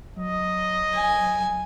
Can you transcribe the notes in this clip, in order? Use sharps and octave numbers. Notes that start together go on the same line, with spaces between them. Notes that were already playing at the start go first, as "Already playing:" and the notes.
F#3 D#5
G#5